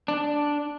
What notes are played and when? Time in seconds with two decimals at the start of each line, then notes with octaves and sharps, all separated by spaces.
0.08 D4